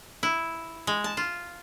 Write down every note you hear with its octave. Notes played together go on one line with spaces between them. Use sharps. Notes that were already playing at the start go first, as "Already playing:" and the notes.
E4
G#3
A5
F4